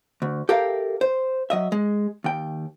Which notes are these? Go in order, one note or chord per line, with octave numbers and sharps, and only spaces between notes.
D2
G4 A4 A#4 E5 F5 G5
C5
F#3 D#5 E5
G#3
D#2 G5